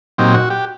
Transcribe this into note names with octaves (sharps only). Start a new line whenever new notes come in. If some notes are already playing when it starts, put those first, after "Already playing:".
A#2 F#3 C4 D#4 G4
F#4
G4